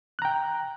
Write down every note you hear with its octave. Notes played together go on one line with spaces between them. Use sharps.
G5 A#5 F#6